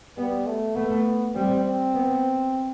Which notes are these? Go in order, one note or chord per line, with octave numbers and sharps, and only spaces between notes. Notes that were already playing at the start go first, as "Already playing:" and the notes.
G3 B3
A3
A3 B3
G3 C4
C4
B3